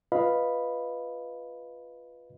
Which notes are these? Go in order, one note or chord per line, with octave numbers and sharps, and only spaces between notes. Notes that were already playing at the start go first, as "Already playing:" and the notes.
F4 B4 D#5 F5 B5